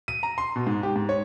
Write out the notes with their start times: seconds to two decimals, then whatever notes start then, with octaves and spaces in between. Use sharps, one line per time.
0.08 D#7
0.23 A#5
0.38 C6
0.56 B2
0.67 G#2
0.83 G4
0.96 G#2
1.09 C#5